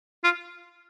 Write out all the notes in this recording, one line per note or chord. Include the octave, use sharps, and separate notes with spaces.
F4